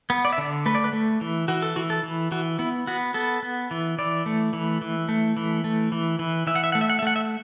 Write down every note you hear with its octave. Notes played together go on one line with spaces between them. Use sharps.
B3
D5
E5
D3 D5
A3 B4
D5
B4
A3
E3
E3 F#4
A4
E3 F#4
A4
E3
E3 F#4
B3 E4
B3 F#4
B3 A4
B3
E3
E3 D5
A3
E3
E3
A3
E3
A3
E3
E3
E3 E5
F#5
E5
A3 F#5
E5
F#5
E5
A3 F#5
E5